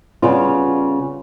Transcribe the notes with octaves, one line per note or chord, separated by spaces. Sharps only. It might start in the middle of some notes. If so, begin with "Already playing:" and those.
C#3 G3 B3 F4